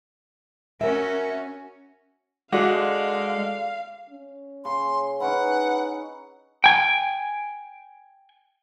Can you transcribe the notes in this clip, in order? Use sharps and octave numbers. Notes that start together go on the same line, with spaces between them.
C#4 F#4 A#4 E5
D3 G#3 F#4 F5
C#4
C#3 C6
C#4 D#4 E4 B4 F#5
G5 G#5